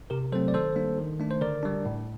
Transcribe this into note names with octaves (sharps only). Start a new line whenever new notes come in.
C3 G4 A#4
F#3 A3 C4 A4 C5
D5
D#3 A4 C5
G3 A#3 D4
D#3
A3 D4
C5
D3 A#4 D5
G3 D4
A2